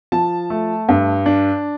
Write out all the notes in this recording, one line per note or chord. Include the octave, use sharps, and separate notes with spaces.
F3 A5
A3
G2
D4